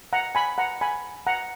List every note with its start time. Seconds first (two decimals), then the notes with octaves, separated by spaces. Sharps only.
0.13 F#5 A#5
0.35 G#5 B5
0.58 F#5 A#5
0.81 G#5 B5
1.27 F#5 A#5